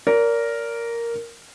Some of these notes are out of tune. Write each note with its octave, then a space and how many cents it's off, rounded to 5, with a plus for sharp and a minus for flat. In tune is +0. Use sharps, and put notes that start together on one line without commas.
A#4 +0 D5 -35